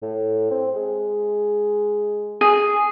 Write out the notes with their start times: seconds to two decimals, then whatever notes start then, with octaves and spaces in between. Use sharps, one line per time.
0.02 A2
0.51 C4
0.76 G#3
2.41 G#4